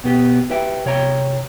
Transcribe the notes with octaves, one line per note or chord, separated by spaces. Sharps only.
B2 B3 G4
G4 B4 E5 G5
C2 C3 C#5 G5 A#5